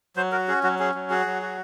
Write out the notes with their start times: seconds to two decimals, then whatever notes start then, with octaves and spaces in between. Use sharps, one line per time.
0.17 F#3 C5
0.32 F#4 A#4
0.48 C#4 G#4
0.63 F#3 F#4
0.79 C#4 G#4
0.95 F#3
1.10 F#4 G#4
1.26 F#3
1.42 F#4